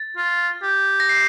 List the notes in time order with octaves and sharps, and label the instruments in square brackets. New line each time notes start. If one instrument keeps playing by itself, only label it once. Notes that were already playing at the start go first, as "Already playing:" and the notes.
Already playing: [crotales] A6
[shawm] F4
G4
[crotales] A#6
C7